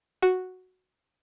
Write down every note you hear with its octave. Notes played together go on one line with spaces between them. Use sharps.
F#4